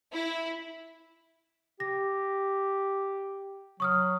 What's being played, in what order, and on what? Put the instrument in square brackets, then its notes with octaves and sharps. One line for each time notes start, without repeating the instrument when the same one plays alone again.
[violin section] E4
[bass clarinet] G4 [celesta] A#6
[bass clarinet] F#3 [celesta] C#6 D#6 F6